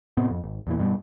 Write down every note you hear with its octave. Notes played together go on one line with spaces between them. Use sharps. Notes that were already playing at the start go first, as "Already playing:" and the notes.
A2 C3 B3 C4
F2
G#1
E2 A#2 E3
G2 B2 F#3 G3